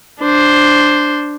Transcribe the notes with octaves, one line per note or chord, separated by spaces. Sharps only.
D4 C5